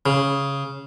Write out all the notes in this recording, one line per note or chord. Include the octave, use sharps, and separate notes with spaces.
C#3